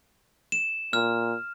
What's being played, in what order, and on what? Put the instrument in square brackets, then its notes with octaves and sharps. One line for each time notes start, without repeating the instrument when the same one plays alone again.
[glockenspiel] E7
[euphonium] A#2 [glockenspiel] F6